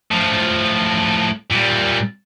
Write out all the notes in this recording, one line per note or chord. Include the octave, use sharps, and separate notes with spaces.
A2 F3
A#2 G3